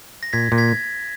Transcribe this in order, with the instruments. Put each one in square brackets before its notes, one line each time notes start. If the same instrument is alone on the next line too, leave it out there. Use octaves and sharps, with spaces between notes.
[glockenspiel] A#6
[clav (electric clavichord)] A#2 [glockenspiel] G#6 B6
[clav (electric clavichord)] A#2
[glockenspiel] G#6 B6